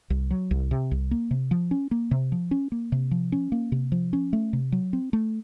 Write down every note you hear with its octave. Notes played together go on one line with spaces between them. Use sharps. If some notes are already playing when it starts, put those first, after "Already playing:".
C2
F#3
C2
C3
C2
A#3
C3
F3
C#4
A#3
C3
F3
C#4
A#3
C3
F3
C#4
A#3
C3
F3
C#4
A3
C3
F#3
C4
A3